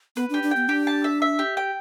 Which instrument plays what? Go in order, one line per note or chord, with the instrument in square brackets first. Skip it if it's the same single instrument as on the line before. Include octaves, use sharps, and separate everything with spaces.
[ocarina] B3 [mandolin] B4
[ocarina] D4 [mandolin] G4
[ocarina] D4
[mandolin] G5
[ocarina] B3
[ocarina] D4 [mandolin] G4
[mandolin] A5
E5
E5
G4
G5